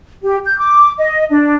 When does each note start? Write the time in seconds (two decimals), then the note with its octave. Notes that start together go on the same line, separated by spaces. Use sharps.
0.23 G4
0.45 G6
0.58 D6
0.98 D#5
1.30 D4